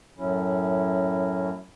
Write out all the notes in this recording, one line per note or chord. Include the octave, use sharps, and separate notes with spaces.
F#2 A2 F#3 C#4 E4